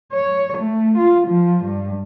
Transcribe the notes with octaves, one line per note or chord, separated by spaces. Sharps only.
C#5
A3
F4
F3
G2